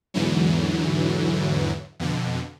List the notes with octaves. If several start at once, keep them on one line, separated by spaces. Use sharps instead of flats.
E2 G#2 D3 E3 F#3
F2 B2 D3